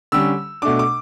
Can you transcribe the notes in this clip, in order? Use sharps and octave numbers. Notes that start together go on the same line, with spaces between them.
D3 G3 C#4 E6
B2 A3 D4 D6
D6